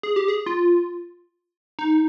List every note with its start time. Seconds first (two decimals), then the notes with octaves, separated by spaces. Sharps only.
0.03 G#4
0.16 G4
0.28 G#4
0.46 F4
1.79 D#4